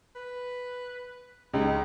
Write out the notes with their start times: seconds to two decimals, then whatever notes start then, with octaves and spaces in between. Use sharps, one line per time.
0.16 B4
1.54 C#2 D#4